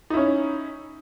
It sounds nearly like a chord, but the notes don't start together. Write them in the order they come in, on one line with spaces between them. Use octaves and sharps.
D#4 E4 C#4